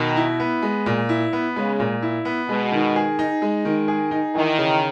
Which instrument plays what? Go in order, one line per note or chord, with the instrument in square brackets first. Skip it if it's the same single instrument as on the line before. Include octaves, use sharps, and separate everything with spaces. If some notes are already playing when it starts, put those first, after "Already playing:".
Already playing: [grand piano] B2 [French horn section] D#3
[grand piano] E4
B3
G#3
A#2
E4
B3
[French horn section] C#3 [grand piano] G#3
[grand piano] A#2
E4
B3
[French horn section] B2 [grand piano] G#3
[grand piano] D#3
G#4
D#4
G#3
D#3
G#4
D#4
[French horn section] D#3 [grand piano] E3
[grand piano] C#3